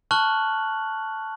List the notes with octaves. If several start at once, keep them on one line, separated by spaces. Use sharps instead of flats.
A5 C#6 F6 F#6 F#7